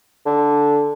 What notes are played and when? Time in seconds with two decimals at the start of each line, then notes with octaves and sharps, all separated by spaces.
0.26 D3